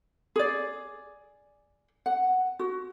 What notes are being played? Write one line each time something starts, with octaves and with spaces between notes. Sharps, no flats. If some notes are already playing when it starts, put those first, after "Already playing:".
G#4 D5
F#5
F#4